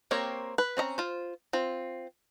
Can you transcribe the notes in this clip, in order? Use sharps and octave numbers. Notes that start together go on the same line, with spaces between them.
A#3 C4 G4 A#4 C#5
B4
C4 C#4 D#5 A#5
F4 C5
C4 F4